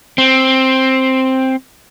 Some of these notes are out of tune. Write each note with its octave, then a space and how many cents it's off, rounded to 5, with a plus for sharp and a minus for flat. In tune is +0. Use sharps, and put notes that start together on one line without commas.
C4 +5